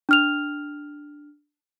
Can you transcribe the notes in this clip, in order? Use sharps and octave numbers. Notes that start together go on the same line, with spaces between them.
D4 F6 F7